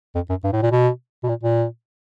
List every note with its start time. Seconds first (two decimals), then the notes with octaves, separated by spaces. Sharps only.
0.15 F2
0.29 F#2
0.44 G2
0.52 A2
0.62 A#2
0.71 B2
1.23 B2
1.29 A#2
1.43 A#2